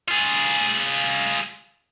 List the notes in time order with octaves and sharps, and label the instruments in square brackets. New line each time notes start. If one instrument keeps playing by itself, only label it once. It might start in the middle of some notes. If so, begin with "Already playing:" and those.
[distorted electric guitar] F4 G#4